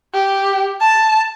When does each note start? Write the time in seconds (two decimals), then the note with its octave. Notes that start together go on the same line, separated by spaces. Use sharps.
0.14 G4
0.81 A5